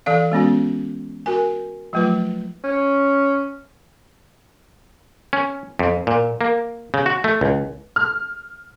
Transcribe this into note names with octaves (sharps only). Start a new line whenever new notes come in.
E3 A4 D5 F5
G#3 B3 C#4 F#4
F#4 A#4 G#5
F3 F#3 A3 F4 B4
C#4
C#4
F2
A#2
A#3
C#3
F#4
A3
C#2
F6